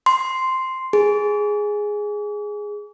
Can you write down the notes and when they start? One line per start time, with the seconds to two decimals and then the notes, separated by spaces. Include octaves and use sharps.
0.06 C6
0.93 G#4